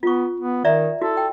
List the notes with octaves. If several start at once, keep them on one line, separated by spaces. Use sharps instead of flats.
B3 F4 C#6
B3
D#3 D5 E5 A#5
E4 F#4 A4
G5